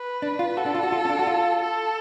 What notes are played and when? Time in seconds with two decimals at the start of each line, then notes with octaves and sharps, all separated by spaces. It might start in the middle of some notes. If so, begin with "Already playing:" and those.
Already playing: B4
0.22 D4
0.39 F4
0.57 F#4 A4
0.66 D4
0.75 F4
0.83 F#4
0.92 F4
1.05 C#4
1.10 D4
1.19 F#4
1.27 F4
1.62 A4